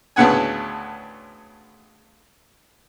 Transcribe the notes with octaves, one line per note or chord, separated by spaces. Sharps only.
D2 A2 C#3 B3 F#5 G#5